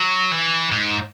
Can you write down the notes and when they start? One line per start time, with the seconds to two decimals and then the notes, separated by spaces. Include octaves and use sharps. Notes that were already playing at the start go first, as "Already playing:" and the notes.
Already playing: F#3
0.32 E3
0.72 G#2